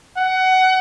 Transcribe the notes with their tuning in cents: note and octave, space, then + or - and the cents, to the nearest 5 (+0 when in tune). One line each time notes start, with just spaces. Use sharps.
F#5 +20